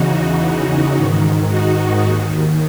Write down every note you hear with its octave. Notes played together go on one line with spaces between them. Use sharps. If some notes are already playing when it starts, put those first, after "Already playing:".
Already playing: E2 C#3 E3 D#4 F#4
G#2 D#3
D#4 F#4
D#2 D#3